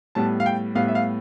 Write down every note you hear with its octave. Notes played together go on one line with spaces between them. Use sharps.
A2 G3 B3 A5
F5
G5
A2 G3 B3 F5
E5
F5